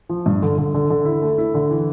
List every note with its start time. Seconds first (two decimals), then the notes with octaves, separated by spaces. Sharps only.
0.09 F3
0.26 G2
0.42 D3
0.58 D3
0.74 D3
0.90 D3
1.05 E4
1.22 A3
1.38 E4
1.54 D3
1.71 E3